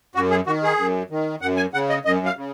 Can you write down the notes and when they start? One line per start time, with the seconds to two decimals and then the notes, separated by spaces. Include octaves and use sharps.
0.15 F#2 F#4
0.31 G#4
0.46 D#3 F#4
0.63 G#4
0.78 F#2
1.10 D#3
1.41 F#2 F#5
1.57 G#5
1.74 C#3 F#5
1.89 D#5
2.05 F#2 D#5
2.26 F5
2.37 C#3